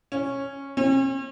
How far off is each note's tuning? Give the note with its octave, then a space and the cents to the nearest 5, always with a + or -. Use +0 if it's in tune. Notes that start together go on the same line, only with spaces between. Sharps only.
C#4 -10
C#4 -45